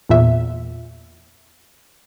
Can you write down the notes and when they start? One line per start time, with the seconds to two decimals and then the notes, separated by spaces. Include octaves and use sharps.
0.09 E2 A#2 E5